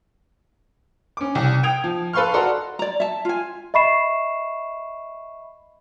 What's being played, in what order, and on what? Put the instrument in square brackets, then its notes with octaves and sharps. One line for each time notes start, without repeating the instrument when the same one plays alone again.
[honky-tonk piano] C#4 D6
C2
G5 D#6 G#6 F7
F3
A4 B4 F5 C6 C#6 F6
F#4 A4 D5 A#5 C6
[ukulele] D5 A#5
E5 A5
F4 G#5
[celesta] D#5 E5 B5 C#6 C7 E7